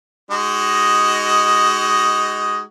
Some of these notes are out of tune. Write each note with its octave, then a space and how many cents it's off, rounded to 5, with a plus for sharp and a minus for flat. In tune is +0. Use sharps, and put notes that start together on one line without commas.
G#3 +0 D#4 +0 F#4 +30